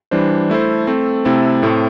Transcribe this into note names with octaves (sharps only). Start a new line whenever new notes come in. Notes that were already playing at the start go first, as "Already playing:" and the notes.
E3 G3 D4 C5
A3 E4 A4 C5
A3 C4 A4
C3 A3 C4 E4 A4
A2 A3 C4